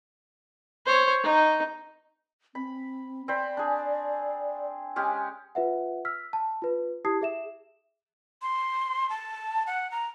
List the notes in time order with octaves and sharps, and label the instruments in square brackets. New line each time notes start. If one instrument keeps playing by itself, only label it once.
[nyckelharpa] C5 C#5
D#4
[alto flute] C4 [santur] B5
[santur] C4 C5 B5 [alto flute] D5
[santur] D4 G#4
G#3 C#4 G4
[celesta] F4 B4 E5 F#5
E6 F6 B6
A5
F4 B4
E4 G4 A5 D#6 G#6 C7
G#4 E5 E7
[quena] C6
A5
F#5
A#5